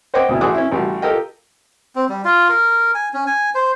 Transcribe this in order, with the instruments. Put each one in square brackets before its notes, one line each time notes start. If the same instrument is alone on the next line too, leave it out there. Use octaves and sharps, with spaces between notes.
[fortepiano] C5 C#5 D#5 F#5 G5 D6
D2 B2 E4
A1 F#4 G#4 D6 D#6 F#6
C#4 E4
A1 G3 F#4
F4 G4 A4 A#4 D#5 G5
[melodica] C4
G3
F4
A#4
G#5
C#4
G#5
C5